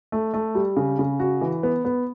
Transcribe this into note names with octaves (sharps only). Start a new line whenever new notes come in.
A3
A3
G3
C#3
C#3
F#4
E3
B3
B3